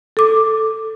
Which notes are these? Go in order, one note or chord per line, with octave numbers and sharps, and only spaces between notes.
A4 D6